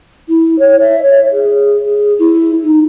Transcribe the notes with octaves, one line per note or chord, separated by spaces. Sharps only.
E4
C#5
E5
C#5
G#4
G#4
E4
D#4